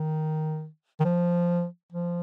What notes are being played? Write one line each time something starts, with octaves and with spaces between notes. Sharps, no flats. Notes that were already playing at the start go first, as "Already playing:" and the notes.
Already playing: D#3
D#3
F3
F3